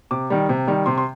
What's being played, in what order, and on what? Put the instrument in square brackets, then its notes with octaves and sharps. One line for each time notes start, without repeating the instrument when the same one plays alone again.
[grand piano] C3 D6
D#3 G3
C3
D#3 G3
C3 C6
C6